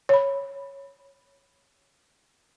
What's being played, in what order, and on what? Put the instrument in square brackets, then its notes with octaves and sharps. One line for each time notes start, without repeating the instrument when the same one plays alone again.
[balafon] C#5 B5